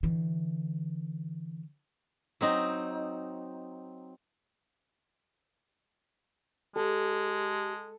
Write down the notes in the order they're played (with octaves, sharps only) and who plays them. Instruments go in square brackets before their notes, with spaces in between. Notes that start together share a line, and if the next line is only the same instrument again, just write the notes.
[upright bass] D3 E3
[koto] F#3 C4 D#4
[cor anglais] G#3 [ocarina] G4 [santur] A4